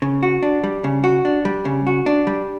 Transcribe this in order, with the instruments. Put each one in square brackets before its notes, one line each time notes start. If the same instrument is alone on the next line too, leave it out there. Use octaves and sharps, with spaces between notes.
[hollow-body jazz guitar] C#3
F#4
D4
G3
C#3
F#4
D4
G3
C#3
F#4
D4
G3